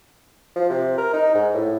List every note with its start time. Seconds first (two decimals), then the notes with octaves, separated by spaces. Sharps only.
0.56 F3
0.70 C3
0.98 A#4
1.13 D#4
1.35 G#2
1.54 A2